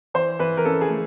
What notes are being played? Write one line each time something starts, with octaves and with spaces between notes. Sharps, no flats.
E3 C5
E3 B4
A#4
C#4 A4
G#4
A3